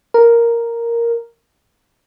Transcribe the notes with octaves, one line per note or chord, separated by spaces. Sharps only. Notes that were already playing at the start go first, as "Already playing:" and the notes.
A#4